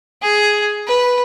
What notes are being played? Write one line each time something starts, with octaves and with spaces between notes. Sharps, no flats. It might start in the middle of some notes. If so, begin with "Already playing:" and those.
G#4
B4